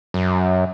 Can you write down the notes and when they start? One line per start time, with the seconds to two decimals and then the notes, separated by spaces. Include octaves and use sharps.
0.14 F#2